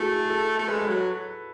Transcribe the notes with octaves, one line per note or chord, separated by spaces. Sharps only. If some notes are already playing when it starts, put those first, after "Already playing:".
Already playing: A3 E4 F#4 G#4
G#4
A4
A3 A4
G#3 B4
B4
F#3